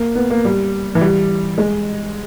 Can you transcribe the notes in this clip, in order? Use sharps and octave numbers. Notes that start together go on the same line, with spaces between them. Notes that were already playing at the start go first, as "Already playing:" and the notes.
Already playing: A#3
B3
A#3
G3
E3
G3
G#3